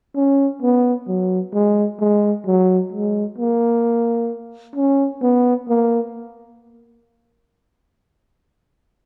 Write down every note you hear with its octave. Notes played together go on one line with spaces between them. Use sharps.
C#4
B3
F#3
G#3
G#3
F#3
G#3
A#3
C#4
B3
A#3